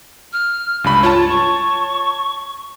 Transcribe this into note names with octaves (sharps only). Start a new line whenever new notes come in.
F6
C#2 G2 B5
F4 C#5 A5
C#6